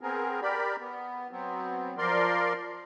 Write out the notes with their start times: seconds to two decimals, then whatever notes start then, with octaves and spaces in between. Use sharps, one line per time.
0.01 B3 C4 G#4 A#4
0.42 G4 A#4 D5 B5
0.80 B3
1.31 F#3 B3 C4
1.98 F3 A#4 D5 C6